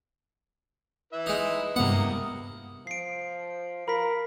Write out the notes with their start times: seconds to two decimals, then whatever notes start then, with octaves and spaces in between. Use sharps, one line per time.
1.13 E4 B4 E5
1.26 G#3 D#4
1.76 G2 C3 G#3 A#3 B3 E4 F#5 D#6
2.87 F3 C7 D7
3.88 F4 A#4 B5 B6